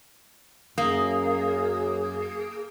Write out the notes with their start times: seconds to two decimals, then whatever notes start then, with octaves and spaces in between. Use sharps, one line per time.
0.78 F#2 A#3 G#4 D#6